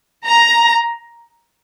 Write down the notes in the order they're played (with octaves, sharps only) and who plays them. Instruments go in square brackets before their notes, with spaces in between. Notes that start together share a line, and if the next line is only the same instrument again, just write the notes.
[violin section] A#5